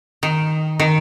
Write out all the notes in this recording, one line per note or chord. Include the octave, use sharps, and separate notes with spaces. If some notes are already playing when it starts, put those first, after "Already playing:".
D#3
D#3